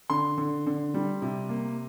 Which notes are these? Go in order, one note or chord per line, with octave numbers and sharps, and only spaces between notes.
D3 C6
D3
D3
G3
C3
A#3